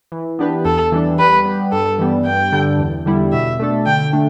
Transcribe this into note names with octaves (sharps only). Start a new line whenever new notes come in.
E3
B3 D4 G4 B4
E2 A4
E3 G3 D4
G3 B4
B3 G4
G2 A4
E3 G3 B3
G2 G5
D3 G3 D4 A4
E2
D3 G3 E4
B2 E5
A3 D4 A4
D3 G5
A3 D4